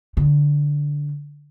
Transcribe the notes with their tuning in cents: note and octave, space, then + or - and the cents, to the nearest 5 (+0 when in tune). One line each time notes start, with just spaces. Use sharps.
D3 -10